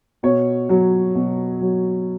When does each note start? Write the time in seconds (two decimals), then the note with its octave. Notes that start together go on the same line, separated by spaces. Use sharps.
0.23 B2 C#5
0.69 F#3
1.15 B2
1.61 F#3